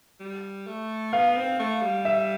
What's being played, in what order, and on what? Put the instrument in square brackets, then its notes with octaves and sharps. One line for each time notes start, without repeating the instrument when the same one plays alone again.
[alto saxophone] G3
A3
[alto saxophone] B3 [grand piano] F5
[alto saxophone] C4
A3
G3
[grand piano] E5